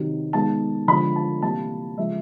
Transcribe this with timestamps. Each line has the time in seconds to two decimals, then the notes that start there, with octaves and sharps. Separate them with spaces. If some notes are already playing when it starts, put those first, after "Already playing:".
Already playing: C3 D#3 F#3
0.33 D#3 G#3 B3 A5
0.88 D3 F3 G#3 B5
1.16 A5
1.42 C3 E3 G3 A#3 A5
1.97 C#3 F3 G#3 E5